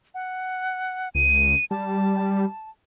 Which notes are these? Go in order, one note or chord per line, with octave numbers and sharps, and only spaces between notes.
F#5
C#2 D#7
G3 A5